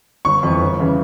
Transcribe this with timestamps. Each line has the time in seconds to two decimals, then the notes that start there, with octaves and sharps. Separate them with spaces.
0.25 G1 C#6
0.43 F2 E3
0.61 G1
0.79 C#3 E3